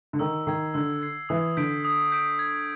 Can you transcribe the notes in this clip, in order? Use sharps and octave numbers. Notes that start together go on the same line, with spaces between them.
D3
D#3 E6
D#3 G#6 C7
D3 E6
G#6 C7
E3 D#6
D3 G6 B6 D7
D#6
G6 B6 D7
G#6